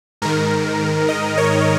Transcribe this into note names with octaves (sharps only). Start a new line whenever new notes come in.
G#2 D#3 A#4
D#5
C#5